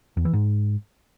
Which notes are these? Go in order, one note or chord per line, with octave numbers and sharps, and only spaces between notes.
E2
E3
G#2